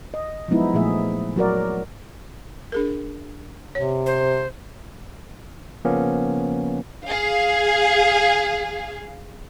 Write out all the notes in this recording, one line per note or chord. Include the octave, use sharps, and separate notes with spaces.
D#5
F3 F#3 G#3 B3 D#4 E4
A#2 F3 A3 G#4 E5
F#3 F#4 A#4 D5
D4 G#4 A#4
C3 C#5
C5
C#3 F3 A#3 B3 C#4
G#4 F5